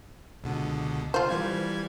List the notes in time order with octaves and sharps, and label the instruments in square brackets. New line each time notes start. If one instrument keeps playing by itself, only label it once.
[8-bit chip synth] C#2 B2 D3
[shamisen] F4 C5
[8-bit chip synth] E3 G3 G#6